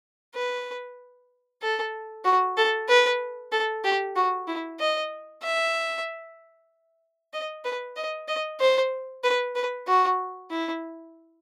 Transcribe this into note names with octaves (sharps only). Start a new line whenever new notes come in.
B4
A4
F#4
A4
B4
A4
G4
F#4
E4
D#5
E5
D#5
B4
D#5
D#5
C5
B4
B4
F#4
E4